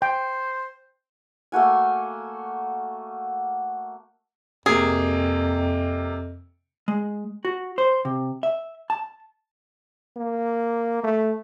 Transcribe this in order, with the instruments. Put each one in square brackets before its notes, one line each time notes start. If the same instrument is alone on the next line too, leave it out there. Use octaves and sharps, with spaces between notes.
[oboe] C5 [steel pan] G5
[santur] A3 A#3 F#4 G#5
[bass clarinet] F2 [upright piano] C3 A#3 [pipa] G#4
[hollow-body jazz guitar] G#3
F#4
C5
C3
E5
A5
[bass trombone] A#3
A3